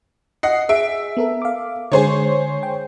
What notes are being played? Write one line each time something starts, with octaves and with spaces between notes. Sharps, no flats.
D#5 F#5 C7
G#4 E5 D7
B3 A4 A#4
F5 D6
D3 G#3 G#4 C5 C#5
G5